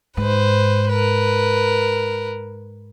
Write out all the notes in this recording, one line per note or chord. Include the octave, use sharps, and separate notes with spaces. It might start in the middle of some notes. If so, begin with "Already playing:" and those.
G#2 B4 C5
A#4 B4